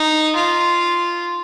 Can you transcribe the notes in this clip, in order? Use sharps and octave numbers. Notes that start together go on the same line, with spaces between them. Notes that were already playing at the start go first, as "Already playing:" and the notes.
Already playing: D#4
F4